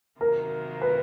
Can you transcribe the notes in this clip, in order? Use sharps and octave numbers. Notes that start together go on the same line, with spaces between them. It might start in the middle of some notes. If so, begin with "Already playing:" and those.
C3 D#3 F#3 A#3 A#4
B4